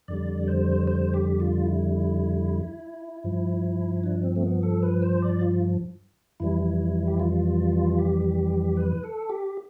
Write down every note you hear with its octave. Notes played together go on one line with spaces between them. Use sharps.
F2 D3 G3 D5
C5
C5
G4
F4
E4
G2 F3
D4
C4
A3
B3
A4
B4
C5
D5
F4
F2 E3 G3 E4
G4
F4
G4
B4
A4
G4